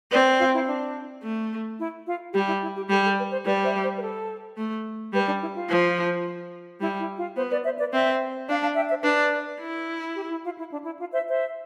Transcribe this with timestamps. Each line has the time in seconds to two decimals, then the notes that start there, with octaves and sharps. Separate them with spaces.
0.12 C4 B4 D5
0.39 F4
0.54 E4
0.68 D4
1.23 A3
1.79 E4
2.07 F4
2.34 G3 G4
2.48 E4
2.62 E4
2.76 G4
2.90 G3 A4
3.04 A4
3.18 B4
3.31 C5
3.46 G3 B4 D5
3.64 C5 E5
3.83 C5
3.97 B4
4.01 A4
4.57 A3
5.13 G3 B4
5.27 D4
5.42 E4
5.55 F4
5.69 F3
6.81 G3 E4
7.00 E4
7.18 F4
7.37 B3 C5
7.50 B4 D5
7.64 C5 E5
7.78 B4 D5
7.93 C4 C5 E5
8.48 D4 D5 F5
8.62 F5 A5
8.76 E5 G5
8.90 C5 E5
9.04 D4 B4 D5
9.60 E4
10.16 G4
10.30 E4
10.44 F4
10.58 E4
10.71 D4
10.85 E4
10.99 F4
11.13 C5 E5
11.28 C5 E5